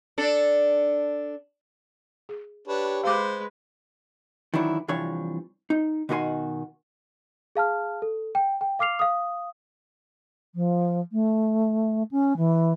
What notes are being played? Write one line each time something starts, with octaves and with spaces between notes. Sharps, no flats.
D4 A4
G#4
D4 G4 B4 C#5
G#3 B4 C5 F5 D6
D#3 E3 F#3 D4 E4
C2 E3 F3 D4 C#5
D#4
B2 D#3 F#4 D#5 G#5 C6
G#4 F5 A5 F6
A4
G5
G5
F5 D6 F6 C7 F7
F5 D#6
F3
A3
C#4
E3